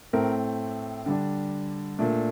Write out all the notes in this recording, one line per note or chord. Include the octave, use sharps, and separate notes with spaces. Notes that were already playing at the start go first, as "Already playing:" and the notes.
A2 A3 C4 A#4
D3 G3 D4
A#2 A3 D4